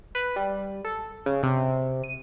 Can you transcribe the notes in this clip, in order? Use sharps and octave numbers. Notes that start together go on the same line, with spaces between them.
B4
G3
A4
C#3
C3
D#7